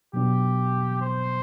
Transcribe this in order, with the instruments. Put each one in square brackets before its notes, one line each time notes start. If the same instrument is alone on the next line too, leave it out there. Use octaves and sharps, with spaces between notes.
[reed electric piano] B2 F#3 B3 D4 [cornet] G4
[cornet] C5